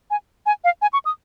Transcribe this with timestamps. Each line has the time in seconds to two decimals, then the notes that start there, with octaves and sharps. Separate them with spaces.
0.11 G#5
0.46 G#5
0.64 F5
0.82 G#5
0.93 C#6
1.05 D#6